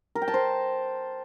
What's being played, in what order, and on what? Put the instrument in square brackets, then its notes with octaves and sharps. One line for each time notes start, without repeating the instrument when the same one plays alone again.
[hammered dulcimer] A#4
G5
A5
C5